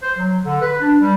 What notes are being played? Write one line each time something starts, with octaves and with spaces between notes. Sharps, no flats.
C5
F#3
D3
B4
D4
G3